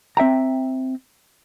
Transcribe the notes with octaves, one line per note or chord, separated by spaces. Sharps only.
C4 E5 G5 A#5